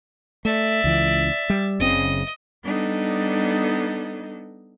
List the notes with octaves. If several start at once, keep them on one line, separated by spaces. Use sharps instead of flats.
A3 D5 E5
C#2 E3
G3
F#1 C#3 C4 D#5
G3 B3 D4 D#4 A4 D#5